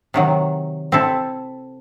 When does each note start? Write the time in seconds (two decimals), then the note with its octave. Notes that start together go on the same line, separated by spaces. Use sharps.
0.14 C3 D#3 F#3
0.92 C4 E4 A4